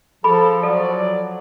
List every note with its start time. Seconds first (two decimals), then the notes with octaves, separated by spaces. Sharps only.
0.24 F3 G#4 A4 B5
0.63 F#3 A4 D5